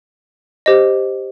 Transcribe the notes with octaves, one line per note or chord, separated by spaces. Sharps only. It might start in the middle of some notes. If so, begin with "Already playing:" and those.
G4 C5 D#5